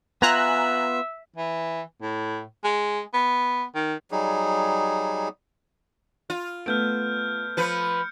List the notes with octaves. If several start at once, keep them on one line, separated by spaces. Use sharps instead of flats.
B3 F4 E5 G#5 A#5 F#6
E3
A2
G#3
B3
D#3
F#3 G3 D#4 G#4
F4
A3 B3 F6 G6 D7
F3 B4 G6 C#7